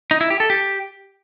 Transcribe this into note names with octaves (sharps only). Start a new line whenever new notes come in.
D#4
E4
G4
A4
G4